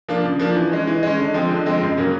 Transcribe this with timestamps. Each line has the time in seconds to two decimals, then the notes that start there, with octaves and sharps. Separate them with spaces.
0.08 F3 A#3 D4 F4
0.24 C#3
0.39 F3 A#3 D4 F4
0.56 E3
0.72 G#3 C#4
0.87 E3
1.03 G#3 C#4
1.19 D3
1.34 F3 G#3 C4
1.50 D3
1.66 F3 G#3 C4
1.81 F#2
1.97 C#3 F#3 A#3 C#4